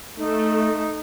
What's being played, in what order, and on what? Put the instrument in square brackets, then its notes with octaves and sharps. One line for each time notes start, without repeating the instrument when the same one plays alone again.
[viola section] A3 [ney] D#4